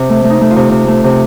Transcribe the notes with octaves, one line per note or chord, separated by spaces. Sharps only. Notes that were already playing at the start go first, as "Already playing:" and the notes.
Already playing: C3
A3
A3
D#4
A3
F4
C3
C3
A3
C3